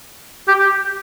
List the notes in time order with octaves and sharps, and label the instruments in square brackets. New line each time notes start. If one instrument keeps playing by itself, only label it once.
[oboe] G4